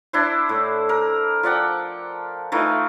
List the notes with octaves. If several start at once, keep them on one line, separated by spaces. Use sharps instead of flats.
D4 E4 C5
A2
A#4
F3 D5 F#5 G5
E3 A3 D#4 F4